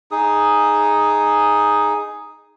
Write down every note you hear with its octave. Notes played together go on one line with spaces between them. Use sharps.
D#4 G#4 D#6